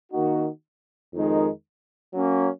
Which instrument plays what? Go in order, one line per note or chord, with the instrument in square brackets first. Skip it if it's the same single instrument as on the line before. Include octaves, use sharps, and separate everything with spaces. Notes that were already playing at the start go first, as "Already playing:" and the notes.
[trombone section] D#3 A#3 D#4 F#4
F2 D#3 G#3 D#4 A#4
F#3 A#3 C#4